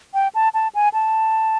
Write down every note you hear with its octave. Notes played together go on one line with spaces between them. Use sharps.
G5
A5
A5
G#5
A5